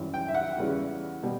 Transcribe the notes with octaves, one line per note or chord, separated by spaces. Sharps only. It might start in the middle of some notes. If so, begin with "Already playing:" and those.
Already playing: F#2 E3 G3
G5
E5
F#5
E2 C#3 E3 G3 C#4
B2 G3